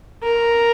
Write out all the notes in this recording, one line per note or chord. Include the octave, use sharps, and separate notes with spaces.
A#4